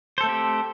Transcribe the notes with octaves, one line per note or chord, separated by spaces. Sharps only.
A3 C4 G4 A4 C5